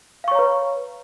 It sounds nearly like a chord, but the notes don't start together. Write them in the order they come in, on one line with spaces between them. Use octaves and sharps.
F5 C#6 C#5 A#5 B4